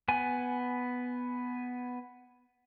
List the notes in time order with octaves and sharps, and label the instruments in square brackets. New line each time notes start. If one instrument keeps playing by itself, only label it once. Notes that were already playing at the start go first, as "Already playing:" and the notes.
[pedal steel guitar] B3 G#5